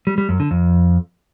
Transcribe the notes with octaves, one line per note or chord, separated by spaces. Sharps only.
G3
G3
F#2
D3
F2